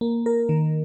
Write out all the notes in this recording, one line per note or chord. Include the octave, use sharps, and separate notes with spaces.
A#3
A#4
D#3